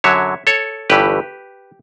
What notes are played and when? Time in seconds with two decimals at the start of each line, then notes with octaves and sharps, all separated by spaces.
0.04 F#2 D3 F#3 C#5 E5
0.47 A4 C#5
0.90 G1 G2 E3 G4 B4